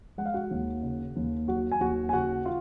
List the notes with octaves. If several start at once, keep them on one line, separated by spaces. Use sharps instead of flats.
G#3 F#5
F5
F#4 F#5
D#2
C#3
D#2
F#3 F#4 F#5
G#5
D#2 F#4 F#5
G#5
C#3 F#4 F#5
F4